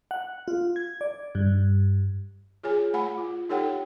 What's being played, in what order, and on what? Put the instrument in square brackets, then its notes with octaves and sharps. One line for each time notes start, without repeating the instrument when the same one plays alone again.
[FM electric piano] F#5
F4
G#6
D5
G2
[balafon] F4 G#4 C#5 G#5
A3 F#5 G#5 B5
F4
D#4 G4 A4 C#5 F#5 G5